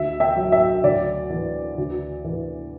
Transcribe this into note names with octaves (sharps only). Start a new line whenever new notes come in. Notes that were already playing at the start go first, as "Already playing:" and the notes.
Already playing: D2 E5
E5 G5
F#3
E5
D2 D5
E3
D2
E3